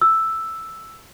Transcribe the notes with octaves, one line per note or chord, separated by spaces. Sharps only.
E6